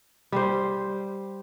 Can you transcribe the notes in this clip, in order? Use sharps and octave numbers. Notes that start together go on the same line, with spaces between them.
G3 C5